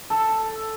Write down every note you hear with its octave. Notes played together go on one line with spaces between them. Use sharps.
A4